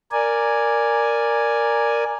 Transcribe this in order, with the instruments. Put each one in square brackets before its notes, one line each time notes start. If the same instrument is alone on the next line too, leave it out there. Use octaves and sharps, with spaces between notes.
[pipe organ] A#4 D5 G#5